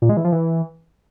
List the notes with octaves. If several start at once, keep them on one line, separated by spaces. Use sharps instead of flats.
A#2
G#3
E3
F3
E3